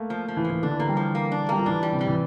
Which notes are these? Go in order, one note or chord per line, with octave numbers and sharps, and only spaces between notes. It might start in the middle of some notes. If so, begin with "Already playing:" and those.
Already playing: A3 A#3
F3
F3
E3
F3
E3
D3 D4
E3
D3 A#3
G3
F3
A#3
D4
G3 A#3
F3
E3 D4
G3
C3
G3
E3